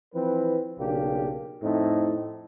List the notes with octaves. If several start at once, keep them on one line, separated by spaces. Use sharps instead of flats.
E3 F3 C4 B4
B1 C#3 A#3 D4 G4
F2 A2 C4 D#4